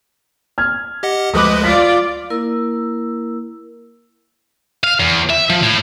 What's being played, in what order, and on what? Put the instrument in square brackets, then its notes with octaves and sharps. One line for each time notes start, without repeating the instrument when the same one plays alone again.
[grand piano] F6 G#6
[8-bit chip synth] G4 D#5 F#5
[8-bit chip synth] D2 F3 G#3 [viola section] B4 D#5 [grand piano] D6 D#6
[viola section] F4 D5 [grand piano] B6
[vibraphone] A#3 E4 A#4 E6
[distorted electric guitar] F5
E2
E5
F3
A2